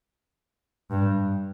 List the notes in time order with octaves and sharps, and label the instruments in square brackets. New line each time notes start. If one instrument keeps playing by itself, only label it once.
[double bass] G2